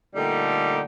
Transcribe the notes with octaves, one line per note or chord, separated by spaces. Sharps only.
A#2 D3 G3 A3 D#4 G4